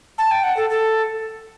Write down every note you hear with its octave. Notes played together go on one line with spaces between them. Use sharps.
A5
G5
F#5
A4
A4